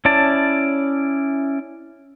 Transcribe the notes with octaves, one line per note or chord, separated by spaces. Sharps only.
C#4 E4 D5 A5